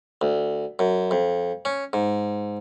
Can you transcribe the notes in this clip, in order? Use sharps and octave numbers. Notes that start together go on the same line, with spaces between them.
D2
F#2
F2
C#4
G#2